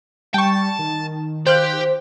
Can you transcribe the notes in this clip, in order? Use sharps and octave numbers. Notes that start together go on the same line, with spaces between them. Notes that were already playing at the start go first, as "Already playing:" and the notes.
G3 G5 A5 C#6
D#3
G4 C5 F5 F#6 G6